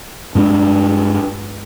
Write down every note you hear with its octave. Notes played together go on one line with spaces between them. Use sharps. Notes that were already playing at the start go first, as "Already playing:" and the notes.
G2 G#3 B3 D4